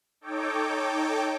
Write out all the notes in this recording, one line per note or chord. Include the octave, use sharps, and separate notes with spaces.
D#4 A4 C#5 G5 D6